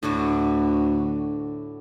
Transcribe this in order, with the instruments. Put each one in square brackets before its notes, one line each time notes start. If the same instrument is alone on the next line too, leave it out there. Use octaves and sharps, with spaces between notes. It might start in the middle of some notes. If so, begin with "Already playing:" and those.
[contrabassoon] D2 [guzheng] A2 D3 F#4